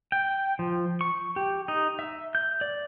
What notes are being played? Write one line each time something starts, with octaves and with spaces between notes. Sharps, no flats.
G5
F3
C#6
G4
D#4
E5
G6
D5